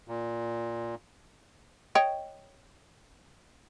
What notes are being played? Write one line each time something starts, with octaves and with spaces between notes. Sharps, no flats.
A#2
C#5 D#5 G5